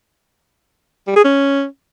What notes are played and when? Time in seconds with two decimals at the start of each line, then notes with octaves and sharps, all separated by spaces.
1.07 G3
1.16 G#4
1.24 C#4